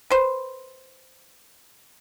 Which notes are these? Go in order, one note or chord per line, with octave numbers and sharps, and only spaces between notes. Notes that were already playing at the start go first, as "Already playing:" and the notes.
B4 C5